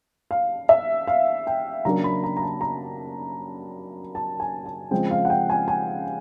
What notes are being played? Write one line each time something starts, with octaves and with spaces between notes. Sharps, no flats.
F5
E5
F5
G5
C#3 F#3 A#3 D4 A#5
B5
A#5
A#5
A5
A#5
A5
G#5
A5
C#3 F3 G#3 C4 G5
F5
F#5
G5
G#5
G#5